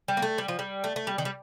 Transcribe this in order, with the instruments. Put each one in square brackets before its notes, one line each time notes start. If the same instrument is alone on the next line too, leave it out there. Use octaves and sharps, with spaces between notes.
[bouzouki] G3
A#3
A3
G3
F3
G3
A3
A3
G3
D#3
G3